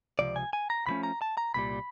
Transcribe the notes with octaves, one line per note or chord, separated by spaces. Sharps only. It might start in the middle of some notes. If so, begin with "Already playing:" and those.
C#2 C3 F3 D5
G#5
G#5
A#5
C#2 C#3 F3 A3 C#4 B5
A#5
A5
A#5
C2 A#2 G3 B5